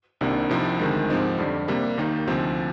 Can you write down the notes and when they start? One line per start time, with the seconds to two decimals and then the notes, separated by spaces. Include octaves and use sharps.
0.21 C2 C3 D#3 A#3 D4
0.49 C2 C3 F3 C4 D#4
0.80 D2 C3 D#3 G#3
1.09 G#2 F3 C4 D#4
1.38 F2 D3 G3
1.68 C3 G3 A#3
1.98 D#2 D#3 A#3 D#4
2.27 D2 C3 F3 C4 D#4